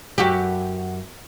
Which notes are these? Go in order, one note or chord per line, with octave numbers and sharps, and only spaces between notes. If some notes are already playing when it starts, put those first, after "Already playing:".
F#2 F#4 G4